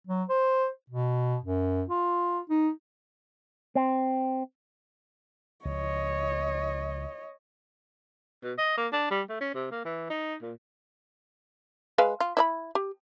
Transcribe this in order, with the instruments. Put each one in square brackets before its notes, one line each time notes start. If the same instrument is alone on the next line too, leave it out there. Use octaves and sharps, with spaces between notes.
[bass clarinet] F#3
C5
B2
F#2
F4
D#4
[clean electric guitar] C4
[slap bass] C#2 F3 [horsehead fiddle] C#5 D#5
[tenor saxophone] B2
D#5
A#3
D4
G3
A3
C#4
C3
A#3
E3
D#4
A#2
[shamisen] G#3 B4 F5
F4
E4 D5 B5
G4